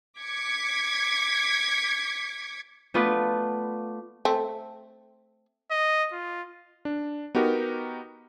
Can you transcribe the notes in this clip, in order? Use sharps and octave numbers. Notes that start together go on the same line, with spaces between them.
D6 G#6 B6 C#7
A3 B3 F4 B4 D5 F#5
A3 C4
D#5
F4
D4
B3 D#4 F#4 G4 A#4